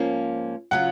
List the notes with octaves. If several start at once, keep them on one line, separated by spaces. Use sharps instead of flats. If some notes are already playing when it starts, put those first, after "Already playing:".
Already playing: G#2 F3 A#3 C#4
C#3 F#3 C#4 F4 F#5